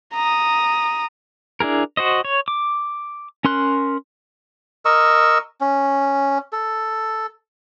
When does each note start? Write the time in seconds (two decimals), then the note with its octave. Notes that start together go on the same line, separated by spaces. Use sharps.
0.14 A#5 D#6
1.60 D4 E4 G#4 A#4
1.97 F#4 C5 D#5
2.25 C#5
2.48 D6
3.45 C#4 A#4 C6 F#6
4.85 A#4 D#5 C#6 E6
5.61 C#4
6.53 A4